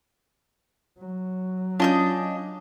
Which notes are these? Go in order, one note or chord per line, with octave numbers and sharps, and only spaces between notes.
F#3
C#4 D4 F4 D#5 G#5 G6